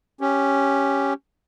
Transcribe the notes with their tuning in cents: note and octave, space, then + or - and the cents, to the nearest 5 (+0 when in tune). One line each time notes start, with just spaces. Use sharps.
C#4 +0 G4 +0